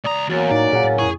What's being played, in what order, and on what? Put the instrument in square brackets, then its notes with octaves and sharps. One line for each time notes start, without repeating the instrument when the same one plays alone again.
[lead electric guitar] C#2 A#5 [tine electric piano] D5 D#6
[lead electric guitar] E2 [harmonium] F#3 A#3 C#4 [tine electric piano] F#4 A6
[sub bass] A2 [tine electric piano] D#4 [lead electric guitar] D5
[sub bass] A#2 [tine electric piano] G#4 C#5 F#5
[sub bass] A2
[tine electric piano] F2 E4 C#6 [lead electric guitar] G#4